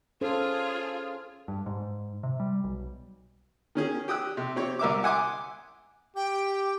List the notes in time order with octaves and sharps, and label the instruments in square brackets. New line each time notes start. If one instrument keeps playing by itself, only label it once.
[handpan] C#4 A4 C5 [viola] F4 G#4
[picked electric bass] G2
G#2
C3
G3
B1
[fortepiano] D#3 C#4 G#4
G4 G5 D#6 E6 F#6
C3
C4 G4 C#5
C2 A#4 E5 D6
E5 F#5 G#5 C6 D6 D#6
[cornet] G4 [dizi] G5